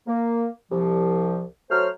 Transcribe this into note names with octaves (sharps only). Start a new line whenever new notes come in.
A#3
C2 F3
F#3 A3 C5 F6